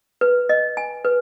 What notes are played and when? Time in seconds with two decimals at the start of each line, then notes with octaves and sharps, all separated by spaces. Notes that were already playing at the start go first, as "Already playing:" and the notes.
0.21 B4
0.49 D#5
0.77 G#5
1.05 B4